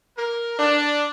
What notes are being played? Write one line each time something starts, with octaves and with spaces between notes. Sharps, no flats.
A#4
D4